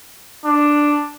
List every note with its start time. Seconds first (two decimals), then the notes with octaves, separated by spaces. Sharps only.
0.45 D4